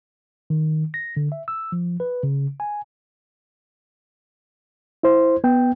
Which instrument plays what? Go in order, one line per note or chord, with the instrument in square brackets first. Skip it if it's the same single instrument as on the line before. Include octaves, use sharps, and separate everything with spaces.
[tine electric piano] D#3
A#6
D3
E5
E6
F3
B4
C#3
G#5
[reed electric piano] E4 C5
B3 G5